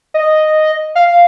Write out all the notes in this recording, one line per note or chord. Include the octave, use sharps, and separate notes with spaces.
D#5
F5